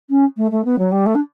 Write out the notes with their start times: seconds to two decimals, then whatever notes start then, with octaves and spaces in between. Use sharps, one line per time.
0.10 C#4
0.37 A3
0.51 A3
0.64 B3
0.78 F#3
0.91 G3
1.06 A3
1.15 D4